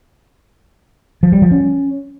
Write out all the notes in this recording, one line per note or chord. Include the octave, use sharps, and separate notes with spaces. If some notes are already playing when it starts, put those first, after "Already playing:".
F3
G3
F3
C#4